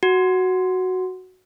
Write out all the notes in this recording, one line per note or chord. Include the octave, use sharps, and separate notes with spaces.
F#4